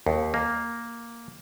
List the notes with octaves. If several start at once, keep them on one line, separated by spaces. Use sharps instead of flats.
D#2
A#3